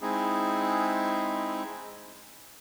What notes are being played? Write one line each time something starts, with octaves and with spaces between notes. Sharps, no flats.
G#3 C4 D#4 E4 G#4